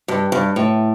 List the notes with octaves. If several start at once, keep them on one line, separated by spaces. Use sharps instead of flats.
G2
G2
A2